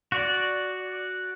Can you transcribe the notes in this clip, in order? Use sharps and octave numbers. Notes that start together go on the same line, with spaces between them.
F#4 D5